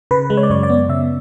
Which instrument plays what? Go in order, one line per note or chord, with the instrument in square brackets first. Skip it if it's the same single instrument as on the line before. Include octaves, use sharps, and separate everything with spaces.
[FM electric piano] C#3 B4
G#3
C#5
D5
F#2 C#5
D5
B3
C#3 E5